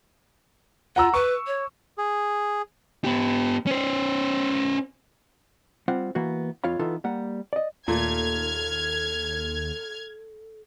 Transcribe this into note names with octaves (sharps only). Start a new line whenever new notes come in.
F4 F#5 A#5 E6
B4 C#6
C#5
G#4
B3 G4
C#4 C5
G3 C4 F4 F#5
E3 A#3 B3 F#4
F2 F4 C#5 F5 B5
E3 B3 D#4 F4 A4
G3 A#3 F#5
D5 D#5
D#2 A#2 A3 A4 F6 G#6